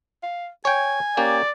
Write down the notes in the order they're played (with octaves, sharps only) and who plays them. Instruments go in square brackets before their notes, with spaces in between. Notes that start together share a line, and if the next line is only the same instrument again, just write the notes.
[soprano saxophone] F5
[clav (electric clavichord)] C#5 G5 [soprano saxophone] G#5
[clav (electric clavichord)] A#3 C#4 G4 [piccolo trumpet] D5